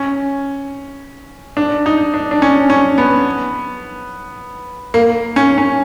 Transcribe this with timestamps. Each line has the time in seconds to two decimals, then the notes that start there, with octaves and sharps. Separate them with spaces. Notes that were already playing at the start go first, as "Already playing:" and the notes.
Already playing: C#4
1.57 D4
1.86 D#4
2.14 D4
2.31 D4
2.42 C#4
2.70 C#4
2.98 B3
4.94 A#3
5.36 C#4
5.58 C#4